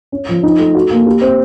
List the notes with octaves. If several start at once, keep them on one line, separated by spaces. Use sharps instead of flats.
C#4
F3
D#4
A3
F#4
A#3
G4
C4